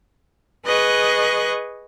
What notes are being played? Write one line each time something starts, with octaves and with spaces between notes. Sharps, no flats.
G#4 B4 D#5 C#6 F#6